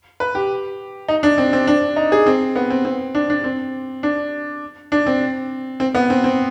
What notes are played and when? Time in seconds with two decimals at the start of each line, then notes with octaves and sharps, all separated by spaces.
0.20 B4
0.35 G4
1.08 D#4
1.23 D4
1.38 C4
1.53 C4
1.67 D4
1.96 D#4
2.12 G#4
2.26 C4
2.56 B3
2.70 C4
2.85 C4
3.15 D4
3.30 D4
3.44 C4
4.03 D4
4.92 D4
5.07 C4
5.80 C4
5.95 B3
6.10 C4
6.24 C4